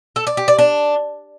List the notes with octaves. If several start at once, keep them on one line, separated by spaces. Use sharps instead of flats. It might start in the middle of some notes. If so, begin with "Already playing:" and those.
A4
D5
G4
D5
D4